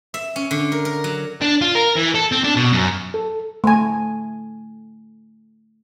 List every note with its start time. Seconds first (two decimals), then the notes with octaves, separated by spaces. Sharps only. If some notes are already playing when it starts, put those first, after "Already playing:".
0.14 E5
0.36 C#4
0.51 D3
0.72 A#4
0.85 A#4
1.04 F#3
1.42 D4
1.61 F4
1.75 A#4
1.96 E3
2.15 A4
2.32 C4
2.44 D4
2.57 B2
2.72 F#2
3.14 A4
3.64 A3 G#5